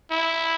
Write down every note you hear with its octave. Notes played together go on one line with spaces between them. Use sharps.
E4